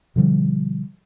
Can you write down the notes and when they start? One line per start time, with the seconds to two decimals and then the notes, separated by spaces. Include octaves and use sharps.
0.16 B2 D3 F3 G3